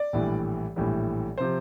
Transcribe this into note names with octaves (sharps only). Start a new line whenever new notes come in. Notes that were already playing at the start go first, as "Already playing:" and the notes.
Already playing: D5
A#1 A2 E3 G3
A#1 A2 E3 G3
C3 F3 C5